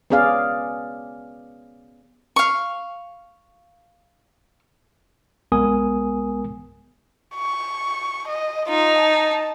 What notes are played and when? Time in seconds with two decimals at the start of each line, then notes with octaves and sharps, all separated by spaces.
0.10 B3 C#4 G#4 D5 F5
2.36 F5 C#6
5.52 B1 G#3 B3 A#4 G#5 D#6
7.35 C#6
8.28 D#5
8.69 D#4 F4
8.98 A5